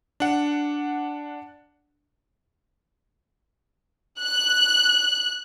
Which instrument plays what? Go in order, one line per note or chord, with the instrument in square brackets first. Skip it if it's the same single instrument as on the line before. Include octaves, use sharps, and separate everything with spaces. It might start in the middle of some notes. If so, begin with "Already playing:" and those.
[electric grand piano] D4 F#5
[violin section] F#6